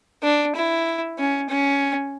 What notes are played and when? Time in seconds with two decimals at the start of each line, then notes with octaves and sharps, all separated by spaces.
0.23 D4
0.55 E4
1.19 C#4
1.49 C#4